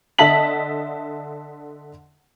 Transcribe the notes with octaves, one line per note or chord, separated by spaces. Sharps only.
D3 D#5 E5 A5 B6 F#7